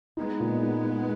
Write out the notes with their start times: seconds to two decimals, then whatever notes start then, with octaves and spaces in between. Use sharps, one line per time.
0.17 G#3 B3 D#4
0.40 A#2
0.62 D#4
0.86 D#4